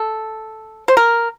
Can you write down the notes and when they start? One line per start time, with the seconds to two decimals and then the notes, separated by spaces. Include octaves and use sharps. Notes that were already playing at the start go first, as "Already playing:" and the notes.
Already playing: A4
0.88 C5
0.97 A#4